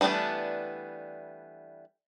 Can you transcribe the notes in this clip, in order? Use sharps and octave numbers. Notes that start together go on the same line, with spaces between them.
E3 G3 A3 B3 D4